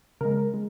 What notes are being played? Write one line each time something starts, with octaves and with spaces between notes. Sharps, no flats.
C#3 G#3 A#4
G#3